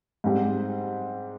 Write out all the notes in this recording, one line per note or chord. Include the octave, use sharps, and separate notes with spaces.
G#2 G3 C4 G4